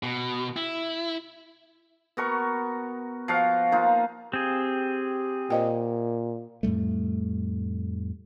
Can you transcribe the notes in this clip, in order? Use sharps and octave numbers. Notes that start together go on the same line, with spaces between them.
B2
E4
B3 F#4 A#4 C#6
F3 F#4 F5
A#3 D#4 F4
C4 G4 G#4
A#2 C5 D#5 G5
F2 A2 G3 A3